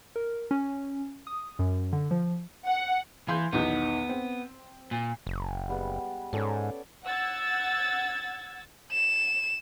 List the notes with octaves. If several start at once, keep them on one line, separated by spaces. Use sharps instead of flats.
A#4
C#4
D#6
F#2
D3
F3
F#5
E3 F5 C6 G6
B1 E2 D#3 B3
C4
A#2
F#1
G3 G#3 B3
G#2 C#4 A4 D5
F#5 E6 G#6 A6
E7